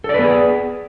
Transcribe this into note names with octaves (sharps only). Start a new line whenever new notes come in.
B3 G#4 A4 B4 D5